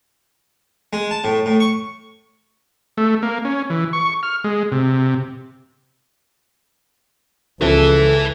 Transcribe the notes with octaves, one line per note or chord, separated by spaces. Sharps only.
G#3
A5
A2
A2
C#6
A3
A#3
C#4
E3
C#6
F6
G#3
C3
C#2 C#3 F3 A4 B4 E5